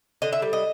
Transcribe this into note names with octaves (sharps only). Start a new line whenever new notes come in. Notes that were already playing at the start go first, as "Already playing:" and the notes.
D3 D#5
E5
G3
D#5